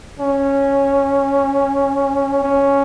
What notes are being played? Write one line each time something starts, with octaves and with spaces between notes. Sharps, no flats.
C#4
C#4